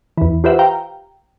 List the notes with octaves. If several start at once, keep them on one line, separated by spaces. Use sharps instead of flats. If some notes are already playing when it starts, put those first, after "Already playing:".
E2 E3
F4 G4 B4 C5 E5 F#5
F5 G5 A#5